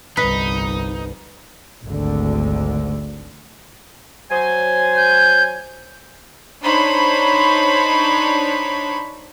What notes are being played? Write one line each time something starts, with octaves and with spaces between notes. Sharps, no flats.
G1 C2 D#4 B4
G#1 D2 D3
F#3 C5 G#5
G6
D4 D#4 C5 C#5 B5